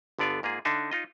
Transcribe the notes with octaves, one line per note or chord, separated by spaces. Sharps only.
G1 D3 B3 D5 F5 G#5
G#2 A#3 F4 G#4
D3 D4 D#4 E5
D#4 F4 D#5